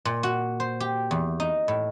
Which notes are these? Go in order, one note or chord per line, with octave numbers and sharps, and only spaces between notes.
A#2
F#4
C5
G4
E2
D#4
A2